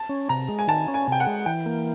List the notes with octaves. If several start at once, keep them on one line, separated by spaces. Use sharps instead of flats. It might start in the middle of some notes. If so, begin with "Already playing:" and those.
Already playing: A5
C#4
C3 A#5
G#3
G#5
D#3 A5
C#4
G#5
C3 G5
F#5
G#3
E3 G5
A#3